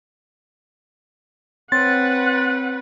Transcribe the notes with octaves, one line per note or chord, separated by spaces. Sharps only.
C4 B4 C#5 F#5 C6 A6